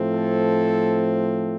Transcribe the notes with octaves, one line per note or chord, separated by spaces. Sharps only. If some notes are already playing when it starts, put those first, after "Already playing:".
Already playing: A2 F3 A3 C4
A4